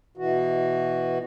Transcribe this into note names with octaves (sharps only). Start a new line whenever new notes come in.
B2 E3 F#4